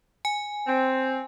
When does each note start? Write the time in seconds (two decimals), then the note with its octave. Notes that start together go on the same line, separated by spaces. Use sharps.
0.25 G#5
0.67 C4